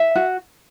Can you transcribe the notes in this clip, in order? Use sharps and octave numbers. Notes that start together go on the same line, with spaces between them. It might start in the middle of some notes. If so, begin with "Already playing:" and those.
Already playing: E5
F#4